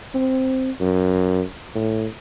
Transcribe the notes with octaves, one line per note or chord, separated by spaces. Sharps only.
C4
F#2
A2